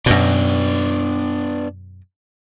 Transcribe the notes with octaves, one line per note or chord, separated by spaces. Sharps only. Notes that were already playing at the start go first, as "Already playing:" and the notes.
F#2 B2 B3 D4